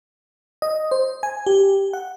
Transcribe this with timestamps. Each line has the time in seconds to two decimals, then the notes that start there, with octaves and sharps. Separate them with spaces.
0.62 D#5
0.91 C5
1.23 G#5
1.46 G4
1.93 F#5